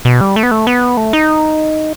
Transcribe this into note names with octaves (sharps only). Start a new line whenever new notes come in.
B2
G3
A3
B3
A3
B3
A3
D#4